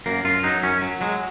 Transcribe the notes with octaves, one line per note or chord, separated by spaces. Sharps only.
F#2 A#3
F#2 F4
F#3 D#4
F#2 C#4
F#3
F#3 G#3